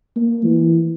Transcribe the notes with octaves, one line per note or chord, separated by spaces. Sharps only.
A#3
E3